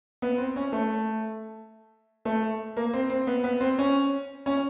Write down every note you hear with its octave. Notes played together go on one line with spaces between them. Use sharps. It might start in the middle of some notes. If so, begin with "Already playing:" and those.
B3
C4
C#4
A3
A3
A#3
C4
C4
B3
B3
C4
C#4
C#4